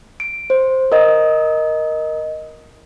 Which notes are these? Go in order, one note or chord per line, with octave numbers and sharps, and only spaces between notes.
D7
C5
A#4 D#5